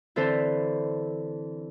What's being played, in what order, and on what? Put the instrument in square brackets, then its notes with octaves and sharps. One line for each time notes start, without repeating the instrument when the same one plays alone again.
[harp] D3 E3 C4 A4 C5 E5